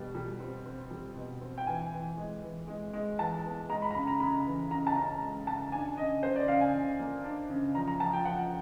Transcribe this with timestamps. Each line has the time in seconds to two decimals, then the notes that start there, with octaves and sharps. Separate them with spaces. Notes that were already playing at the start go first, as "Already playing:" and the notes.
Already playing: B2 G3
0.15 G3
0.40 C4
0.66 C4
0.90 G3
1.16 B2
1.41 C4
1.58 G5
1.67 E3 G#5
1.92 E3
2.17 G#3
2.43 E3
2.68 G#3
2.93 G#3
3.19 E3 A5
3.44 B3
3.70 G#3 A#5
3.82 B5
3.91 A#5
3.95 C#3 B5
4.07 A#5
4.20 C#3 B5
4.45 E3
4.71 C#3 A#5
4.87 A5
4.96 C#4 A#5
5.22 G#3
5.47 C#3 A5
5.72 D4 G#5
5.97 C#3 D#5
6.23 C#3 C5
6.36 D5
6.48 C#3 F5
6.61 G#5
6.74 C#3
6.99 A#3
7.24 D4
7.50 C#3
7.75 F3 A#5
7.87 A#5
8.00 F3 A5
8.13 G5
8.25 F3 F#5